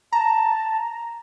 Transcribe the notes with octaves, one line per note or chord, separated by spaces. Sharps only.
A5 A#5